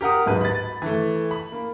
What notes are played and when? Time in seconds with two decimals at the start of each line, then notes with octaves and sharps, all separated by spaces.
0.01 G4 A#4 F#5 D#6
0.26 D1 G#2 B4
0.41 B5 A6
0.82 E3 A3
1.31 B5
1.52 A#3